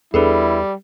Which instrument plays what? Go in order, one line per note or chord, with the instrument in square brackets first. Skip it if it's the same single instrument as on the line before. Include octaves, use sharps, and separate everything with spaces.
[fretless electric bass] E2 D4 [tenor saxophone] G3 [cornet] E4 [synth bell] G#4 A4 B4